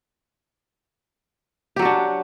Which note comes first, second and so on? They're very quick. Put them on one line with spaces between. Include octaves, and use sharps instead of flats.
G4 F#3 F#4 D4